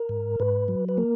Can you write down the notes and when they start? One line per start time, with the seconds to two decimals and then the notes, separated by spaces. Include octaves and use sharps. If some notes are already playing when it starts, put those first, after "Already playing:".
Already playing: A#4
0.09 G#2
0.40 G#2 B4
0.68 F#3
0.89 B4
0.97 A#3 A#4